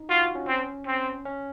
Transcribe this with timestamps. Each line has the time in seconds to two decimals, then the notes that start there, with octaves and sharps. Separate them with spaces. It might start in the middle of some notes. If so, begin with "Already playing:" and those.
Already playing: D#4
0.09 F4 F#4
0.22 F4
0.35 C#4
0.48 C4
0.87 C4
1.25 C#4